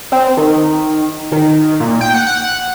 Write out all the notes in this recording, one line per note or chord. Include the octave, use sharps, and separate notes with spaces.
C4
D#3
D#3
A#2
G5
F#5
F#5